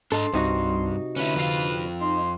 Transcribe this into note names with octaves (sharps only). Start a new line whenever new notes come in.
G#2 D4 A4 D#5 C6
C2 G2 C3 D#4 F#4
D3 C#4 E4 B4
F2 F4 F5
D#4 C6